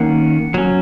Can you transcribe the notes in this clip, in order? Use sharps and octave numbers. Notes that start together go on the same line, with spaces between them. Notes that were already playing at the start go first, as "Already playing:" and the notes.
Already playing: D#3 A#3 C#4 F#5
F#3 C#4